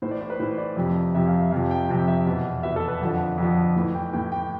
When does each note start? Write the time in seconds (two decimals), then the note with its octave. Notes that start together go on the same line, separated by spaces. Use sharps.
0.02 A2 E3 C5
0.11 D5
0.21 C5
0.30 B4
0.40 A2 E3 C5
0.58 D5
0.77 F2 C3 F3
1.14 F2 C3 F3 E5
1.27 F5
1.40 E5
1.51 F2 C3 F3 F5
1.71 G5
1.89 F2 C3 F3 G5
2.08 E5
2.26 E2 B2
2.63 E2 B2 E5
2.76 A4
2.88 B4
3.01 F2 D3 F3
3.38 F2 D3 F3
3.76 A2 E3
3.95 G5
4.13 A2 E3 G5
4.32 G5